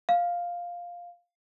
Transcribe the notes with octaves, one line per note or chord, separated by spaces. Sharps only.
F5